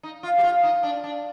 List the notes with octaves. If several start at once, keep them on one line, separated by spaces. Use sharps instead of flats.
D#4
F4
G4
F4
D#4
D4
D4